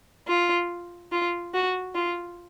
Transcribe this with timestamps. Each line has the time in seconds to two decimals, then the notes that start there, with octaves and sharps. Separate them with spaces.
0.27 F4
1.12 F4
1.54 F#4
1.95 F4